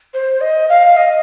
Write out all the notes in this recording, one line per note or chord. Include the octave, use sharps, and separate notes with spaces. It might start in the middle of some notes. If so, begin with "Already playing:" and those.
C5
D#5
F5
D#5